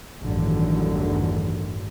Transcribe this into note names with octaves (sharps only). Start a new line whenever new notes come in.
A1 E2 G2 D3 D#3 F#3